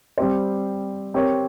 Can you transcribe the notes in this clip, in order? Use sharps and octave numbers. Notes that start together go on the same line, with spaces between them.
G3 C4 G4 C5
C4 G4 A#4 C#5